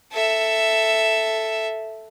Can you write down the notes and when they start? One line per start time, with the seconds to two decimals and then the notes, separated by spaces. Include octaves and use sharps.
0.12 A4 E5